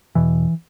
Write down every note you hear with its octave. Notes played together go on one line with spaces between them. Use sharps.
E2 B2 E3